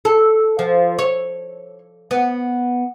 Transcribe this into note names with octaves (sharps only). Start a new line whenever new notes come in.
A4
F3
C#5
B3